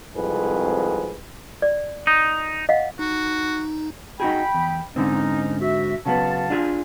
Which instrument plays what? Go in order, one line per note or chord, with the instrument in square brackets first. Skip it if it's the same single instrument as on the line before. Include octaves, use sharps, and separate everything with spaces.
[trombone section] C2 F2 G#2 G#4 B4
[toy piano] D5
[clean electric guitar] D#4
[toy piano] D#5 F5 F#5
[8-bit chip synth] D#4 [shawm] F#4
[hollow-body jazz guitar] D#4 F#4 G#4 [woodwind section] G5 B5
[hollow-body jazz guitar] E2
[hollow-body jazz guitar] G#2 D3 C4 [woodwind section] C#4 D#4
[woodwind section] F#4 E5
[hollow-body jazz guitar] C#3 F#3 B3 [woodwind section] F5 F#5 A5
[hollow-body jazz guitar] D4 F4 G#4